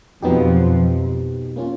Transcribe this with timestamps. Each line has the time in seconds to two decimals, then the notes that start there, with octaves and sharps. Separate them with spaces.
0.22 F2 B2 F3 F#3 B3 D#4 G4
1.56 A#3 C#4 F4